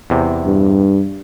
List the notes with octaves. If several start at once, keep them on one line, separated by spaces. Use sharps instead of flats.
E2 C3
G2